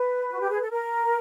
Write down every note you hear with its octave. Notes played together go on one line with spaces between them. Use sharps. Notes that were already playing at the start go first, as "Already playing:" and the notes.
Already playing: B4
F#4
G4
G#4
A4
A#4